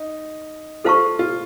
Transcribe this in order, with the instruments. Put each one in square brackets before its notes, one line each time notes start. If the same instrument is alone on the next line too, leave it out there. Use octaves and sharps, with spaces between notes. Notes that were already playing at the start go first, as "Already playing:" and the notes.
Already playing: [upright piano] D#4
[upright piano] F4 [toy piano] A4 C5 F5 A5 C#6
[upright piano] F4